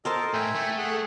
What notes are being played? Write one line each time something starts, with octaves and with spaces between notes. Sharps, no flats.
A4 A#4 C5 D#5 A5
A2 E5 G5 G#5
A3
G#4 F#5